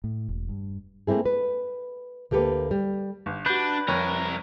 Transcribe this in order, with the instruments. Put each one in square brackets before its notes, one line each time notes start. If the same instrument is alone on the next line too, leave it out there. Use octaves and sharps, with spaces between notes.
[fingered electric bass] A2
E1
G2
[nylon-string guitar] A3 A#3 C4 E4 G#4
B4
D2 A#3 G4 A4 B4
G3
[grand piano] G1
[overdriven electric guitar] D4 [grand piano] F#4 G6 [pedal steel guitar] B4
[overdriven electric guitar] C2 A#4 [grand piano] F2 C#5